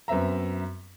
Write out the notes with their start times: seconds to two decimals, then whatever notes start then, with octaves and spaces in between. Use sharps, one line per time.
0.08 F#2 B3 C4 E5 A#5